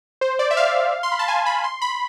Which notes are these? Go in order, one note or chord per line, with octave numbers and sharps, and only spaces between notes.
C5
D5
E5
F5
C6
B5
A5
G#5
B5
C6
B5